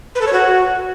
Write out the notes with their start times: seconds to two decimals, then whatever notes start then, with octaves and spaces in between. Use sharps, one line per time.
0.15 B4
0.21 A4
0.27 C#5
0.33 F#4